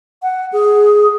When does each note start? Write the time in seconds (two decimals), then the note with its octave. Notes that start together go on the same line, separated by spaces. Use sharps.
0.22 F#5
0.52 G#4